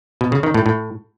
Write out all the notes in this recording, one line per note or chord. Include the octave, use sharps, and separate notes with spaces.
B2
C#3
D#3
A2
A2